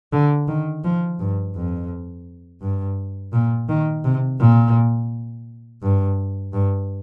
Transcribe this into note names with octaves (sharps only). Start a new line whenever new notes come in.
D3
D#3
F3
G2
F2
G2
A#2
D#3
C3
A#2
G2
G2